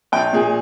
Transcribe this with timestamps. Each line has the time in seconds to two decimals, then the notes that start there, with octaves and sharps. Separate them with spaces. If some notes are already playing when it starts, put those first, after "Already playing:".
0.12 A#1 G5
0.33 A#2 G#4